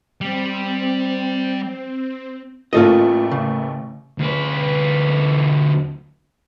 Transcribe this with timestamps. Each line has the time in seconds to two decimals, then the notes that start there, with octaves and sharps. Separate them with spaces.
0.21 G3 C4
2.73 A1 A3 A#3 F4 A4 D#5
3.31 C#3
4.19 D2 B4